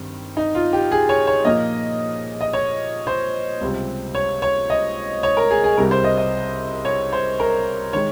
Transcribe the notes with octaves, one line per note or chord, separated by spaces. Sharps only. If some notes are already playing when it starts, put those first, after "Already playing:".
Already playing: G2 D#3 G3 C4
D#4
F4
G4
G#4
C#5
C#5
A#2 F3 A#3 D#5
D#5
C#5
C5
C#2 C3 G3 C4
C#5
C#5
D#5
C#5
A#4
G#4
G#4
C2 C3 G3 A#4
C5
D#5
D#5
C#5
C5
A#4
D#3 G#3 C#5